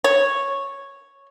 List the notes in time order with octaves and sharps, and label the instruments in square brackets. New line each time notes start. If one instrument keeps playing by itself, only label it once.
[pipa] C#5